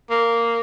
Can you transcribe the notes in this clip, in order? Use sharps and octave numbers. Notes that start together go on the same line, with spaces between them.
A#3